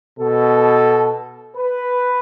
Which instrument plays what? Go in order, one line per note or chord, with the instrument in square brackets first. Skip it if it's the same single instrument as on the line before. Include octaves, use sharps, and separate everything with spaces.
[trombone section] B2 A4
B4